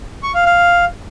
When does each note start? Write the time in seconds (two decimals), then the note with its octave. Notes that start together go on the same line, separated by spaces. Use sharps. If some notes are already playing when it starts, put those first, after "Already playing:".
0.23 C#6
0.34 F5
0.46 F5